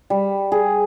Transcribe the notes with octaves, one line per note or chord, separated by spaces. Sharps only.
G3
G#4